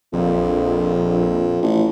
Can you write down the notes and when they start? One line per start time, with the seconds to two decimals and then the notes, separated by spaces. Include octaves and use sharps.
0.13 A#1 F2
1.62 A1